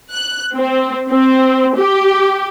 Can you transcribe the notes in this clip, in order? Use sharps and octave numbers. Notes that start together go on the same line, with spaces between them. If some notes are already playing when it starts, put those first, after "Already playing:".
F#6
C4
C4
G4